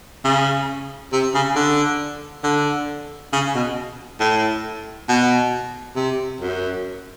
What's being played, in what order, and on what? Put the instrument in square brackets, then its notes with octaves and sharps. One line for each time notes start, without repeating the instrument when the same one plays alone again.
[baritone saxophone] C#3
C3
C#3
D3
D3
C#3
B2
A2
B2
C3
F#2